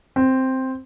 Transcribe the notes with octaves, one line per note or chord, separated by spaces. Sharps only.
C4